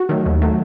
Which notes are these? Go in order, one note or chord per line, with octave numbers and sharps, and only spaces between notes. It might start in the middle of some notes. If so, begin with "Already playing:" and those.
Already playing: F#4
D#3 F#3 A3
D#2
D#3 F#3 A3